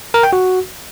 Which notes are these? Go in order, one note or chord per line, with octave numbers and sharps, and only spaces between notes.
A#4
G5
F#4